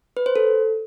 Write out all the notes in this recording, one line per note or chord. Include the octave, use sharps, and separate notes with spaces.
B4
C5
A4